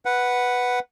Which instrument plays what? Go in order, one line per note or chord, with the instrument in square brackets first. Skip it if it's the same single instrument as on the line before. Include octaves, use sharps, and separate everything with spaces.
[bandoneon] B4 F#5